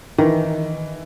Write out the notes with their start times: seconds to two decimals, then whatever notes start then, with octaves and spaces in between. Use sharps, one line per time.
0.18 D#3 E3